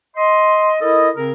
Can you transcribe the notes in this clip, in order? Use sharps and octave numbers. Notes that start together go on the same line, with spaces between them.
D#5 C6
E4 A4 A#4 D#5
C#3 C4 G#4 A#4